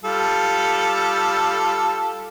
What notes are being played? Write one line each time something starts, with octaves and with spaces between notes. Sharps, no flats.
G3 F4 A4